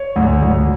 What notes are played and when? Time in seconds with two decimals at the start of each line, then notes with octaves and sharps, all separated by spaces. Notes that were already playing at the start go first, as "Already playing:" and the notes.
Already playing: C#5
0.16 D2
0.42 D2